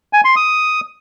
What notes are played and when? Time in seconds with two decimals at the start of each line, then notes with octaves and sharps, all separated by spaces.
0.13 G#5
0.25 C6
0.36 D#6